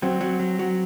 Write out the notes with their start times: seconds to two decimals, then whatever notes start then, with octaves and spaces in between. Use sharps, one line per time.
0.02 F#3 C4
0.21 F#3
0.40 F#3
0.59 F#3